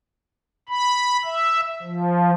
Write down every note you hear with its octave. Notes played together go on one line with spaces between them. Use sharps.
B5
E5
F3